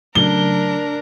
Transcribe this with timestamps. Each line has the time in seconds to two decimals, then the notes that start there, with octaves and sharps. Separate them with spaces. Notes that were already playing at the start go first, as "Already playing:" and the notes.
0.15 C#3 F#3 A3 D4 A#4 G7